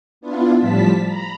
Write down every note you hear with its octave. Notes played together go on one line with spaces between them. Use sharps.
B3 D4 E4 F4
A2 F3 G3 A5 B6
A#5 B5